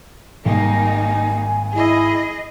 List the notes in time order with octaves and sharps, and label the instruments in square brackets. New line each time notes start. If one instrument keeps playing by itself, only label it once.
[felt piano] G#1 [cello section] G3 A#3 D#4 [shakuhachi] G#5
[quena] E4 [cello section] G#4 D#5